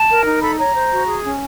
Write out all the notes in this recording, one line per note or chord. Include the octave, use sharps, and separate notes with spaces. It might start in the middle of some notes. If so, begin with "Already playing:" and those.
Already playing: A5
A#4
D#4
A4 B5
C#5 A#5
C5
F#4
G#4
C#4